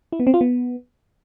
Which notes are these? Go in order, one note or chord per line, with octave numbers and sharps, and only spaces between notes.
E4
B3
C4
F4
B3